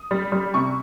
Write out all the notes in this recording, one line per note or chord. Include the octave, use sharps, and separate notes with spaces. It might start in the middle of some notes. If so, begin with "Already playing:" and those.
Already playing: D#6
G3
G3
C3 C#6